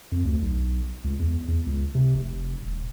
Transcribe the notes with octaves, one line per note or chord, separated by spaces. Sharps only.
F2
D2
B1
C#2
E2
E2
C#2
C3
F1
D#1